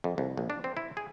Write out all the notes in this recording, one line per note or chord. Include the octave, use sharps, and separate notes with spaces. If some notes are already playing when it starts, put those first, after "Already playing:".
F2
C2
A#1
D4
C4
E4
G#4